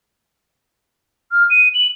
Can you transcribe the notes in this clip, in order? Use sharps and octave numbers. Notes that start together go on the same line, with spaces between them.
F6
D#7
F#7